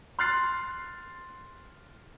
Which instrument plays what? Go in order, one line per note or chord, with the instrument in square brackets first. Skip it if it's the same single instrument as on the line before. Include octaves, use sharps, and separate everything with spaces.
[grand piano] C6 F6 F#6 A6 C7